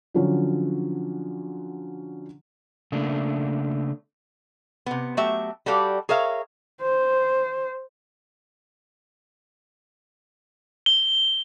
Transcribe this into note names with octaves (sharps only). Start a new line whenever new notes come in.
D3 F3 F#3 C#4
C#3 A3 A#3 D4
C3 B3
F#3 A3 G4 E5
G3 F#4 G4 A4 D5 F5
G#4 A#4 C#5 E5 F5
C5
G7